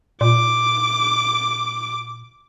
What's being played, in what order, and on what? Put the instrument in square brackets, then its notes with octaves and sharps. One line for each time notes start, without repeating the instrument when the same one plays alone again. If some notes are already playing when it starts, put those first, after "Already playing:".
[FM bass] A#2 [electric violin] D6